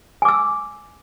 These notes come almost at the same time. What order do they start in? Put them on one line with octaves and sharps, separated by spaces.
G#5 D6 E6